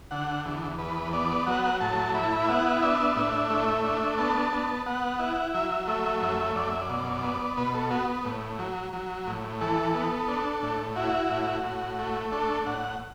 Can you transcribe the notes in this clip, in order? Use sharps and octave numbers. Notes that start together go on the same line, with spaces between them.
D3 F#5
E2
E2 B4
B3 D5
F#3 F#5
A2 A5
E4 B5
A5
B5
E5
B3 F#5
F#5
D4 E5
A2 E5
A3
D4
B3 A5
B3
B3 F#5
E4
F#3 E5
A3 E5
F#2 E5
F#2 D5
E5
D5
B2
B3
B2 B4
A4
B3 F#4
A2
F#3
F#3
A2
E3 A4
B3
D4
A2
E4 F#4
A2
A2
A3
D4 A4
A2 F#5